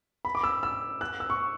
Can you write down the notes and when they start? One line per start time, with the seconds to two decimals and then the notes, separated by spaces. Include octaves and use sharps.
0.25 B5
0.35 D6
0.44 E6
0.63 E6
1.01 F#6
1.20 E6
1.30 C#6